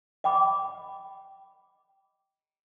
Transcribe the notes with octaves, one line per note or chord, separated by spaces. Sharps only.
D#5 G5 B5 D6